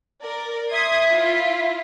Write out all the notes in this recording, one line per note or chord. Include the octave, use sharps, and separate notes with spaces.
A#4 D5
E5 C6 D#6 G#6
E4 F4